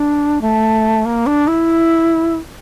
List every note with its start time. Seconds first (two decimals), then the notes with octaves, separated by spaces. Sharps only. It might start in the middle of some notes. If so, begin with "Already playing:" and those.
Already playing: D4
0.41 A3
1.05 A#3
1.26 D4
1.47 E4